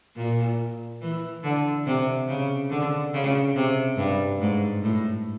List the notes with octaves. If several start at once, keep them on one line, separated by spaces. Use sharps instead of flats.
A#2
E3
D3
C3
C#3
D3
C#3
C3
G2
G#2
A2